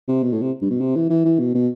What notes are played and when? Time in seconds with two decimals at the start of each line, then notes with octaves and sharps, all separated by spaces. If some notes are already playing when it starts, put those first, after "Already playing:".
0.08 C3
0.23 B2
0.32 A2
0.42 C3
0.61 G2
0.70 B2
0.81 C3
0.96 E3
1.10 E3
1.25 E3
1.39 B2
1.55 B2